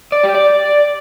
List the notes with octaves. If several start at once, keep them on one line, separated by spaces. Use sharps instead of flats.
D5
G4
D5